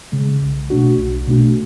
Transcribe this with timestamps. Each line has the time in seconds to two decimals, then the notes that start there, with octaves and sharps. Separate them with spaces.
0.12 C#3 G#3
0.41 B1
0.70 B2 A3 D4 F#4
0.99 B1
1.28 B2 A3 D4 F#4